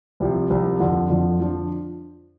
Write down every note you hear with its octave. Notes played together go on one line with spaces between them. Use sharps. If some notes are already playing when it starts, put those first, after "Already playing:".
C2 C3 F3
C2 C3 F3
F2 D3 F3
F2 D3 F3
F3 D4